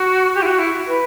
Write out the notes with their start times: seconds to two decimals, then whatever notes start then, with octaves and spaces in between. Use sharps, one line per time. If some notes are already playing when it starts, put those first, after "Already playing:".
Already playing: F#4
0.35 G4
0.42 E4
0.46 F#4
0.59 E4
0.88 B4